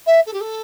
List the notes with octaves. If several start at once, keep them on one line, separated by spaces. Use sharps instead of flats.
E5
A4
G4
A4